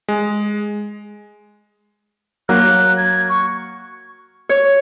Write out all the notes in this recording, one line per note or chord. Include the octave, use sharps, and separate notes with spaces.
G#3
F#3 A#3 F#6
G#6
C#6
C#5